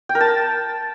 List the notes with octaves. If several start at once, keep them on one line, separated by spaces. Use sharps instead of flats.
G5
A#4
A5